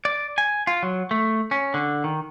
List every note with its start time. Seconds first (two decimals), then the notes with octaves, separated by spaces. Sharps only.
0.05 D5
0.38 G#5
0.67 F4
0.83 F#3
1.11 A3
1.51 C#4
1.74 D3
2.04 D#3